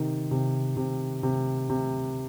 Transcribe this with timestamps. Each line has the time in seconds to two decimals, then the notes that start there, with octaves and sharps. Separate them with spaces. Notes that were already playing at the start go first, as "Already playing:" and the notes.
Already playing: C3 D#3
0.31 C3
0.77 C3
1.23 C3
1.70 C3